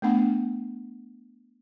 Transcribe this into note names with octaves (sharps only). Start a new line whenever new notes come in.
A3 B3 D4 F#5